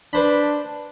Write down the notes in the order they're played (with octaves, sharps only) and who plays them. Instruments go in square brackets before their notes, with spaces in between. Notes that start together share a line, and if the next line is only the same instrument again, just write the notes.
[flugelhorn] D4 [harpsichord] B4 C5 B5